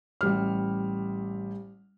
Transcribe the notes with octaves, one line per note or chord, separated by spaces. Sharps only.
A1 G3 F6